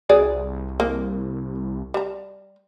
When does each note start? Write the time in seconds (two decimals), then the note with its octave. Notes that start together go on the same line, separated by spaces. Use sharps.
0.09 C2 F#3 G#4 D5
0.80 A#3
1.94 G3 A#5